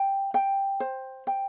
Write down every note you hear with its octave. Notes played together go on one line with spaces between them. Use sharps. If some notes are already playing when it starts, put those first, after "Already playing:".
Already playing: G5
G5
C5
G5